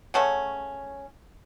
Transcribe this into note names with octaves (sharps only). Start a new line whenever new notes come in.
C#3 F#3 A3 C#4